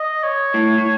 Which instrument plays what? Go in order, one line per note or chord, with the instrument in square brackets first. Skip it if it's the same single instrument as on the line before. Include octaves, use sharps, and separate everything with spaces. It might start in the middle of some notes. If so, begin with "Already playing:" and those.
Already playing: [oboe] D#5
C#5
[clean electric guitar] A2
A2